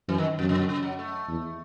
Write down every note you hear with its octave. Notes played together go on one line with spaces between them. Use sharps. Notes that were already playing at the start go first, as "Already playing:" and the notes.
F#2 E3
D#3
F#2 B2
C#3
B2
C#3
F#3
A3
E2